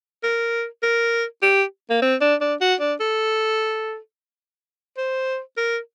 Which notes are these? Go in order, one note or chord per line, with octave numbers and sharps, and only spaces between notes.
A#4
A#4
G4
A#3
C4
D4
D4
F#4
D4
A4
C5
A#4